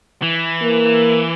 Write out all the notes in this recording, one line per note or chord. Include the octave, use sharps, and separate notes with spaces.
E3
A#3